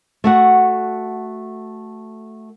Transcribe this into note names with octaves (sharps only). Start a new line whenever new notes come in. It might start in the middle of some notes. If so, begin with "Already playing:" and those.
A3 F#4 F#5